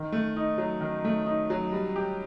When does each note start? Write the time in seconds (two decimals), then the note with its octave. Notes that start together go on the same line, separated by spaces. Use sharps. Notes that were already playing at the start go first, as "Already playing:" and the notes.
Already playing: D#3
0.12 A3
0.36 D#4
0.58 F#3
0.81 D#3
1.05 A3
1.26 D#4
1.50 F#3
1.72 G3
1.96 G4